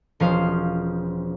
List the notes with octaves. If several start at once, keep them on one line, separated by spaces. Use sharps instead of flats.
E1 F3 C#4 C5 F5